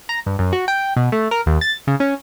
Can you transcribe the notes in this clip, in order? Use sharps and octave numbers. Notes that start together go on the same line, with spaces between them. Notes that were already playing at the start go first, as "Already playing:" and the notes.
A#5
G2
F#2
F#4
G5
B2
A3
A#4
D#2
A6
C#3
C#4